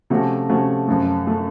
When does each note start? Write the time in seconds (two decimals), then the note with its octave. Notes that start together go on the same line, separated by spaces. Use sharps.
0.10 C3 F3 A3 C#4 F#4
0.49 C3 F3 A3 C#4 F#4
0.88 F#2 F3 A3
1.27 F3 A3